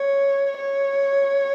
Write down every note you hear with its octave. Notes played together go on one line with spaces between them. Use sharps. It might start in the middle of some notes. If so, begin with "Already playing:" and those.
Already playing: C#5
C#5